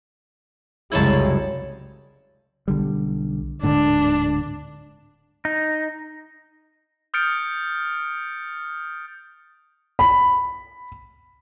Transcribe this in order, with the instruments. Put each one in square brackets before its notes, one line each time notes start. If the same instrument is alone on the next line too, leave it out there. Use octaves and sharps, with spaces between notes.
[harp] F#1 G#6 [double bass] C2 G#3 [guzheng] E4 C#5 A5
[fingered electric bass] B1 D3 G3
[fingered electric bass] D1 G#2 D3 [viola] D4
[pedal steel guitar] D#4
[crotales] D#6 F6 G6 A6 C#7 D7
[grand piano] B5